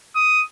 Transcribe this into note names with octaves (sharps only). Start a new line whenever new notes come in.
D#6